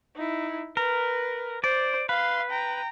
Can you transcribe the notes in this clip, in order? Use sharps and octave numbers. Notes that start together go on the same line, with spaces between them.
D#4 E4
A#4 B4
C5 D5
B4 F5 C6
G5 A#5